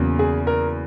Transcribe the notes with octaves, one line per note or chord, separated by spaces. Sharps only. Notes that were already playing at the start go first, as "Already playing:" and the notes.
Already playing: E2 C#3 F#3 A#3
G#4
A#4